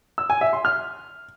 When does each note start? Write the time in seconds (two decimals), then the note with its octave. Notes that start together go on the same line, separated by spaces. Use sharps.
0.18 E6
0.30 G#5
0.41 E5
0.53 C6
0.65 F6